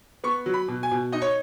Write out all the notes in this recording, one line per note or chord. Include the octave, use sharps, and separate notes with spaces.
B3 C#6
F#3
B5
B2
G#5
B2
D#4 D#5
C#5